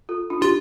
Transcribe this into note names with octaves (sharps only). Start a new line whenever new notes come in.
F4 A4
D4 F4
D#4 F4 G4